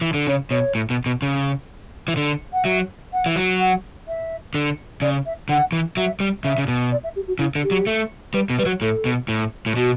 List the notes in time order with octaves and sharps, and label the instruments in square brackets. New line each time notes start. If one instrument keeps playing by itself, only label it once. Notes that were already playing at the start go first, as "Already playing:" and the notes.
[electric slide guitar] E3
D3
[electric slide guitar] C#3 [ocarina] C#5
[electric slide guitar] B2 [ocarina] C#5
[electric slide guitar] A2
B2
B2
C#3
E3
D3
[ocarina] F#5
[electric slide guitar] F#3 [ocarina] E5
[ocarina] F#5
[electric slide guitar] E3
F#3
[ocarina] F#5
E5
[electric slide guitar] D3
[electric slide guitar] C#3 [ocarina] D5
[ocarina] E5
[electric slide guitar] D3 [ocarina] F#5
[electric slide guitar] E3
[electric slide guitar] F#3 [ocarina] E5
[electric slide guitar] G3
[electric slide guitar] C#3 [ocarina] E5
[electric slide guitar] C#3
B2
[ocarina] D5
E5
G4
F#4
[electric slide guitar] C#3 [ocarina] E4
[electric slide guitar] D3
[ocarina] G4
[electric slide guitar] F#3
A3
[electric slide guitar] G3 [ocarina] B4
[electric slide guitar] B2
[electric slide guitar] G3 [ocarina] B4
[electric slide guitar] F#3
[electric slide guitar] A2 [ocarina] A4
[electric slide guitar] B2
A2
A2
[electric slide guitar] B2 [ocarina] F#4